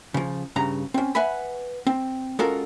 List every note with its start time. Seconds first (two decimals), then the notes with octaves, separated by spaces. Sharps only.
0.14 C#3 F3
0.56 G2 C#3 A#5
0.94 C4 C#4
1.15 B4 E5 F#5 G#5 B5
1.87 C4
2.39 G#3 C#4 F4 F#4 A4 A#4